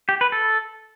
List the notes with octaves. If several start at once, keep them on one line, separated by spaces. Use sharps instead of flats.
G4
B4
A4